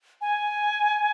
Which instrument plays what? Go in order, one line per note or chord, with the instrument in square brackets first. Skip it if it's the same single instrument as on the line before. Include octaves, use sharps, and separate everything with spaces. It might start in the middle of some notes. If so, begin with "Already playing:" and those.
[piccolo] G#5